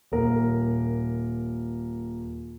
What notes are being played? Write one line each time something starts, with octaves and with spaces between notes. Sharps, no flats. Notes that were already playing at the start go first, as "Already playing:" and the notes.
D#1 A#4